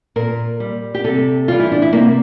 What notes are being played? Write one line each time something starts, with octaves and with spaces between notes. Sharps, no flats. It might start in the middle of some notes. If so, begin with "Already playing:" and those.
A#2 A#4
G3
G4
C3 A4
E3 G3 F4
E4
D4
E4
C3 A#3